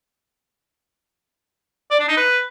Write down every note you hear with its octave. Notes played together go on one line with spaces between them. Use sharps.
D5
D4
D#4
B4